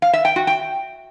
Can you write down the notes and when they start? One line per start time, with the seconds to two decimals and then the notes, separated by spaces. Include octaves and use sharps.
0.02 F5
0.13 E5
0.25 G5
0.36 F#4
0.47 G5